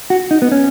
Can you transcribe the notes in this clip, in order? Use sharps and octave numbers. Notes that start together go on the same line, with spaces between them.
F#4
D#4
B3
C#4